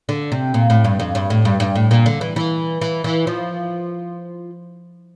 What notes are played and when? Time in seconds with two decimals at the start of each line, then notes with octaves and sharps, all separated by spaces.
0.09 D3
0.32 C3
0.54 A#2
0.70 A2
0.84 G2
1.00 F2
1.15 G2
1.30 A2
1.45 G2
1.60 G2
1.75 A2
1.91 A#2
2.06 D3
2.21 E3
2.36 E3
2.81 E3
3.04 E3
3.27 F3